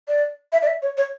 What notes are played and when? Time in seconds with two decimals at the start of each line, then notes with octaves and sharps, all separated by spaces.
0.08 D5
0.52 E5
0.62 D5
0.67 E5
0.82 C#5
0.97 C#5